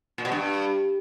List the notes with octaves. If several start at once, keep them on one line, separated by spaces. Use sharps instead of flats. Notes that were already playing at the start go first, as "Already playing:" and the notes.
A#2
B2
G2